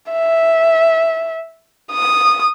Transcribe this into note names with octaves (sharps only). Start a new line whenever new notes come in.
E5
D#6